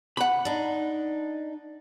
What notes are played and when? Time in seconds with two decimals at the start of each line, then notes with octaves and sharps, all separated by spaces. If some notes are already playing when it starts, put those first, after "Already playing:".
0.17 F#5 B5
0.45 D4 D#4